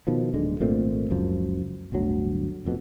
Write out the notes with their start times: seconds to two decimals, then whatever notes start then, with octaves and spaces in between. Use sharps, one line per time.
0.07 B2 D#3 F3
0.33 D1 D3 G#3
0.60 G#1 A#2 A3 C4
1.10 F#1 C#2 F#2 F3
1.92 D1 G1 D2 F#3
2.65 F1 F2 B2